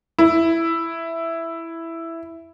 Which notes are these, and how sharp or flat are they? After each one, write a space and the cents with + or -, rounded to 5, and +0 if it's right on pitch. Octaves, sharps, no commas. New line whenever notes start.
E4 +5